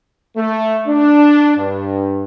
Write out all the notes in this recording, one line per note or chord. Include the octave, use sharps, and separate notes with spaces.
A3
D4
G2